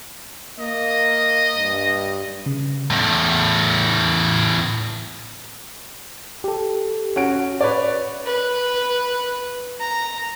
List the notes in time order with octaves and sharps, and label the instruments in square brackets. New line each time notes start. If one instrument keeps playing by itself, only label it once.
[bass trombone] A#3 [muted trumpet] D#5
[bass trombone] G2
[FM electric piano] C#3
[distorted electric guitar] E2 A2
[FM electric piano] G4 A4
[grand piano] C#4 F#4 D7
B4 C#5 D5
[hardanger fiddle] B4
A#5